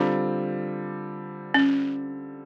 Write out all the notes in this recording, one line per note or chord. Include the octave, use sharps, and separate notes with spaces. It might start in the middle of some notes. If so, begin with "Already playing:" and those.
Already playing: D3 G3 C4 D4 F4
C#4